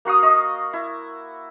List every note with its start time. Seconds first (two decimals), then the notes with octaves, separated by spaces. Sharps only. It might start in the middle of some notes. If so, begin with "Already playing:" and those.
0.05 A#3 F#4 F5 D#6
0.23 D#5 C#6
0.73 E4